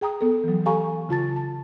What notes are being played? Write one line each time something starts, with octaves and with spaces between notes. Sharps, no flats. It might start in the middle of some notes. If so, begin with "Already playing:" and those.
G#4 G5 A#5 D#6
B3 A4
E3 F#3
G4 A4 F5 G#5 A#5 C#6
C#3 F4 A5 A6
A5